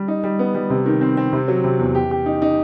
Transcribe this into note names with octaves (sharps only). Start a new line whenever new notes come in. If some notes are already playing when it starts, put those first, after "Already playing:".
Already playing: G3
D#4
G3
B3
G3
C3
D#3
C4
C4
C3
F#3
C3
E2
G4
G4
D#4
D#4